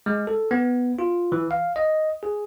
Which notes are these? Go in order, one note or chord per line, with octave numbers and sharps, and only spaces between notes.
G#3
A4
B3
F4
E3
F5
D#5
G#4